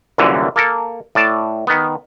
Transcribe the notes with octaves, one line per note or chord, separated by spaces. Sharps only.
C2 F#2 A#2 D3 E3
A#3 A4 A#4
A2 D5 A5
D#3 B3